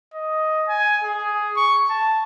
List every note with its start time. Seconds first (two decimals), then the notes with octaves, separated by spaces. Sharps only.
0.14 D#5
0.68 G#5
1.04 G#4
1.57 C#6
1.91 A5